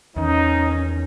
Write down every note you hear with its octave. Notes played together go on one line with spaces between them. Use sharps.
E2 D#3 C#4 D#4